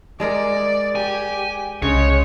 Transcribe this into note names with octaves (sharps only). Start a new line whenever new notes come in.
G#3 G#4 A#4 D5
G4 G#5
C2 C#3 G#3 C#5